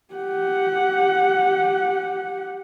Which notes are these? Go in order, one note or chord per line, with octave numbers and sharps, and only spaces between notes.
G4 F#5